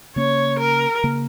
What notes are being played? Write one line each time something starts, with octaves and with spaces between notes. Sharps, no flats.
C#3 A#3 C#4 C#5
A#4
C#3 A#3